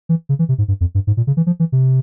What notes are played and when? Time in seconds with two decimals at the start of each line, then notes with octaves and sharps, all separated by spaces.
0.09 E3
0.29 C#3
0.39 E3
0.49 C3
0.58 G#2
0.68 G2
0.81 F2
0.95 G2
1.07 G#2
1.17 A#2
1.27 C#3
1.37 E3
1.47 F3
1.60 E3
1.72 C3